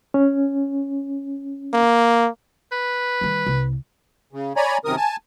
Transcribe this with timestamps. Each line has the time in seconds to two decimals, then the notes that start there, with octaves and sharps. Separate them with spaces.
0.14 C#4
1.74 A#3
2.72 B4
3.21 D#3 G3
3.47 C2
4.33 C#3
4.56 C#5 D5 G#5 A#5 B5
4.85 F#2 C3 D#3 A#4 D#6
4.97 G#5 A5